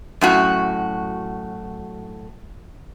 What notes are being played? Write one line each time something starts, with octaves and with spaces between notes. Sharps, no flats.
F#2 A2 F#4